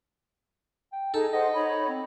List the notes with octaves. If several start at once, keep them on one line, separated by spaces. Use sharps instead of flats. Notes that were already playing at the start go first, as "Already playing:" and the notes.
G5
D#4 G#4 A4 D#5 G#5
D#4 C5 D#5 F#5
D#4 C#5 B5
C4